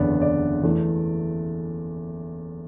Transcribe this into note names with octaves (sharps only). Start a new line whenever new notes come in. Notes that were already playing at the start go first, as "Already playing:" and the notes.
Already playing: F#1 E2 D3 B3 D5
D5
E2 E3 A3